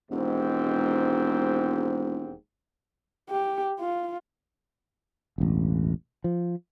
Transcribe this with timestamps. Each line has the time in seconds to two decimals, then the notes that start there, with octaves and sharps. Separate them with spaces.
0.11 E1 D#2 G#2 C4
3.31 G4
3.80 F4
5.38 E1 A1
6.24 F3